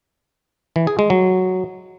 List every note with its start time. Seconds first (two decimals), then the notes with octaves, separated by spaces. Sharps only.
0.76 E3
0.87 G#4
0.99 G#3
1.10 F#3